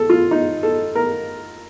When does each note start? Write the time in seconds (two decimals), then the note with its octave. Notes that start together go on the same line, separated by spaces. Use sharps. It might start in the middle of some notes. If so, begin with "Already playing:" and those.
Already playing: A4
0.10 F4
0.31 D#4
0.63 A4
0.95 A#4